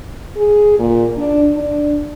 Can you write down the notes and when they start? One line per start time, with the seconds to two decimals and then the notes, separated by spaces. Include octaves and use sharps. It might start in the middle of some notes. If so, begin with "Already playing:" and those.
0.37 G#4
0.79 A#2
1.17 D4
1.56 D4